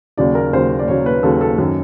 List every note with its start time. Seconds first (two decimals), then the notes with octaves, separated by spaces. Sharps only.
0.18 D#2 C#3 F#3 D5
0.35 A#4
0.53 D#2 C#3 F#3 C5
0.79 D5
0.88 D#2 C#3 F#3 C#5
1.06 B4
1.23 D#2 C#3 F#3 A4
1.41 A4
1.58 F#2 D#3 F#3